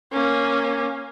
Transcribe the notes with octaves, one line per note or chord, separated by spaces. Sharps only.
A#3 C#4